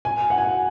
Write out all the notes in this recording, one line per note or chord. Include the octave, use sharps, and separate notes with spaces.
G#5
F#5
G#5